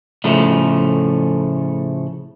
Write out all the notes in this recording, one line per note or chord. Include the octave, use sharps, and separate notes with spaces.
A2 C#3 F3 A3